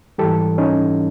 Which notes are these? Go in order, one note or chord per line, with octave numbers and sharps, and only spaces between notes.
G#2 E3 G3 G4 A4
C#4 D#4